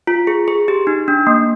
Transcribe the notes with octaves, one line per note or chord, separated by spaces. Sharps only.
F4
G#4
G#4
G4
D#4
D4
A#3